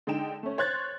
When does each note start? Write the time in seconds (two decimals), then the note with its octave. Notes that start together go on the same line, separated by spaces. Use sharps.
0.07 D3 G#3 D#4 G5 E7
0.43 A3 C#4
0.58 C5 C#5 C6 F#6 G#6 A6